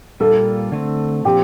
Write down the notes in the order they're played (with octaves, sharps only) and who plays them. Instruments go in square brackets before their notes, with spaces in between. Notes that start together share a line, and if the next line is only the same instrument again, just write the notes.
[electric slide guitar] A#2 G3 A#3 F4 [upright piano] A4
[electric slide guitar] D3 A3 C4
[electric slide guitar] A#2 F3 C4 [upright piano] G4